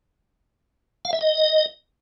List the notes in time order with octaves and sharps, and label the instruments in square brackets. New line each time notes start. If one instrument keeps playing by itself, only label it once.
[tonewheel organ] F5
E5
D#5